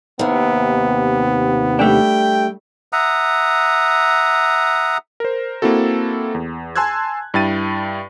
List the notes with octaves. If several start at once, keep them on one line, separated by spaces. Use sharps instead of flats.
D#2 C3 B3
G3 A3 D4 G5
E5 F#5 A#5 D#6
A#4 C5
A#3 C4 E4 F#4 A4
E2
G#5 A5 C6 E6 F#6 G#6
G2 E4 G5 A6 D#7